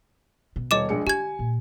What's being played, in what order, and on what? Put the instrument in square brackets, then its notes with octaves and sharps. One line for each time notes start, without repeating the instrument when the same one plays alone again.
[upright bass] B2
[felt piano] D#1 C#5 [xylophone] D#5 D6 E7
[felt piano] A#1 G#3 C#7
[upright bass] D3 [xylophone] G4 G#6 [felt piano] G#5
[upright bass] A#2